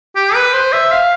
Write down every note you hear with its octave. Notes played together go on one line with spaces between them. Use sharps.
G4
B4
C5
E5
F5